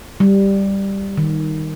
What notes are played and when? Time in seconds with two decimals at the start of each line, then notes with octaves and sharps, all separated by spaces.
0.20 G3
1.18 D#3